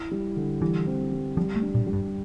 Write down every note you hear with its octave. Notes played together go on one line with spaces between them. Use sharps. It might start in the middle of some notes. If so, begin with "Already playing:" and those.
Already playing: E4
G3
D3
E3 G3
C4
G3
F3 G3
A3
D4
A#2
G3
G2